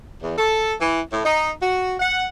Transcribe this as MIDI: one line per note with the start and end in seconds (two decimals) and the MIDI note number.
0.21 0.34 40
0.37 0.73 69
0.80 1.00 52
1.11 1.20 45
1.25 1.50 63
1.60 1.94 66
2.00 2.24 78